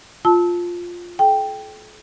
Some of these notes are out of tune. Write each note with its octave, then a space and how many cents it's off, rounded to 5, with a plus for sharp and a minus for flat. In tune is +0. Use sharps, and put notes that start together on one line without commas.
F4 +5 A5 -5 E6 -30
A4 -45 G5 +0